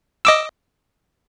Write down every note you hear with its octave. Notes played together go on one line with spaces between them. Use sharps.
D#5 D6 E6